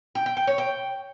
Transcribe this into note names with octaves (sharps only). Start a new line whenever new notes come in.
G5
G5
G5
C#5
G5